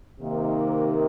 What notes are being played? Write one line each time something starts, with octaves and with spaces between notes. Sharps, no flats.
C3 D#3 A#3